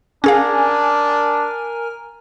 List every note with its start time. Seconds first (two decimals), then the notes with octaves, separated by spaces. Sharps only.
0.24 C#4 D4 G#4 A#4 F5 G#5